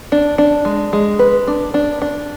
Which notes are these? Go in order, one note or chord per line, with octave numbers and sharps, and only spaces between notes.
D4
D4
G#3
G#3
B4
D4
D4
D4